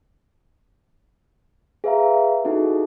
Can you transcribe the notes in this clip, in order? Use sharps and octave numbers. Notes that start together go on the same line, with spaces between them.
G#4 B4 E5 F5 A#5
D#4 E4 F#4 G#4 A4